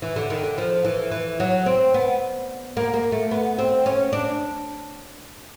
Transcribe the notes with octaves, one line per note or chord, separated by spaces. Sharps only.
E3
D3
D#3
D3
F3
E3
E3
F#3
C4
B3
A#3
A#3
A3
B3
C4
C#4
D4